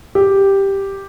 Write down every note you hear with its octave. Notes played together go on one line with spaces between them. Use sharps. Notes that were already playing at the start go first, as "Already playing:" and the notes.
G4